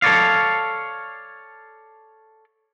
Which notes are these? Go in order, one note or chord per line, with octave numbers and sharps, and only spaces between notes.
A4 C#5 D5 F5